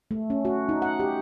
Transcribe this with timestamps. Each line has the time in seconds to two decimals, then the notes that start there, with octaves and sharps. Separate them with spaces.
0.11 A3
0.30 C#4
0.45 F#4
0.69 D#4
0.82 F#5
1.00 G4